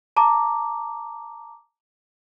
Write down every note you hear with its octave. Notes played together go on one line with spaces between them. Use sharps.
A5 A#5 D6